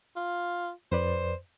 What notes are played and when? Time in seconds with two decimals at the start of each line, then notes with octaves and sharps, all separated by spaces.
0.16 F4
0.92 F2 B4 C5 D5